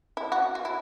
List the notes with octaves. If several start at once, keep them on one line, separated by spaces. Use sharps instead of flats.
E4
F#4
F#4
E4